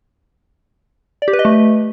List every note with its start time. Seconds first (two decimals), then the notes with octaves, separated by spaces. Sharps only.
1.22 D5
1.28 G4
1.33 B4
1.39 D#5
1.45 A3